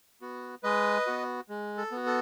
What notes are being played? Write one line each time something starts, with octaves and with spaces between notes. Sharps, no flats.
B3 F#4
G#3 B4 D#5
B3 F#4
G#3
A4
B3 F#4
A4